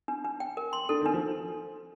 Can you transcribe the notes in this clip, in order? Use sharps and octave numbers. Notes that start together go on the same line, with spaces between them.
D4
D4
G5
A#4
C6
D4 A4
D#3
D4
F3